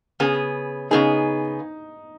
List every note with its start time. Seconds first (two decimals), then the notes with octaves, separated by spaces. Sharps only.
0.20 C#3 B3 G#4
0.91 C#3 B3 D#4 G#4